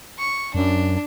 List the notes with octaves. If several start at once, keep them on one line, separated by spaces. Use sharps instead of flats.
C#6
F#2 D4